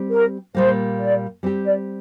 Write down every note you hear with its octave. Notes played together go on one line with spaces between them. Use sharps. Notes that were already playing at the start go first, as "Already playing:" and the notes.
Already playing: G3 C4 G4
A#4
A#2 G3 A#3 C5
D5
G3 C4 G4
D5